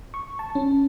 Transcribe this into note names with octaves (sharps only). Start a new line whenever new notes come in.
C#6
A5
C#4